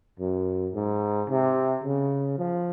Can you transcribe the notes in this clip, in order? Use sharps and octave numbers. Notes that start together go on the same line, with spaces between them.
F#2
G#2
C3
C#3
F3